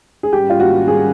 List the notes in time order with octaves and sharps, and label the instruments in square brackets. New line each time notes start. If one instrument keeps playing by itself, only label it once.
[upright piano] G#4
[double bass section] G#2 D#3 G3 A#3 C#4 [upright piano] G4
[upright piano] F4
F#4
G#4